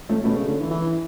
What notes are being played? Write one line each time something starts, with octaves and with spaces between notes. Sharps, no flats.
A3 C#4
B2 A3 C#4
C#3
D3
E3
E3